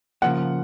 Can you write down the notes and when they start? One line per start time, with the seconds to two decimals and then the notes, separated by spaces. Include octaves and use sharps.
0.22 C#3 F3 A#3 F#5